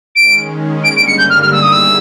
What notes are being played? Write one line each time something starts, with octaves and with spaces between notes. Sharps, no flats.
D#3 G#3 C#4 D7
G2 D3 G3 A#3 D7
D7
C#7
G6
F6
F6
D#3 G3 B3 E4 G#4 E6
D#6
E6